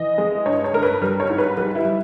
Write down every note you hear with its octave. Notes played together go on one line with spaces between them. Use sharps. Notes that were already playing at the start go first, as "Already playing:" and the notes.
Already playing: E3 D#5
G#3
G2 C#5
C#5
G2 A#4
B4
G3 A#4
C#5
G#2
B4
G3 B4
E4
G3